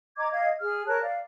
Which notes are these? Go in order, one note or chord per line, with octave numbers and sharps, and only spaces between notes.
D#5 A#5 D6 G#6
D#5 F5 G#6
G#4 F6
A#4 C#5 A5 F#6
D5 F5